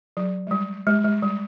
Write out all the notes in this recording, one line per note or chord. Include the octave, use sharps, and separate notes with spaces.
F#3
G#3
G3
G#3
G#3
G3